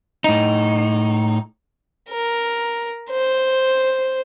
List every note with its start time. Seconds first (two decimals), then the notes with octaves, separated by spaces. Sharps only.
0.24 A2 D#4
2.10 A#4
3.10 C5